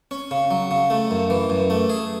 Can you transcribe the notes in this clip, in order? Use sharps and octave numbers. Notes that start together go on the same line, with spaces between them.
C#4
C#3
F#3
C#3
A3
F#2
E3
F#2
A3
G#4